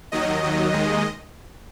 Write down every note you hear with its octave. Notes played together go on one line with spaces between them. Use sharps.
D#2 D#3 F#3 D#5
D#2 D#3 F#3
D#2 D#3 G#3